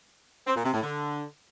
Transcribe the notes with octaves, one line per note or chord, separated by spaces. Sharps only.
C4
A#2
C3
A2
D3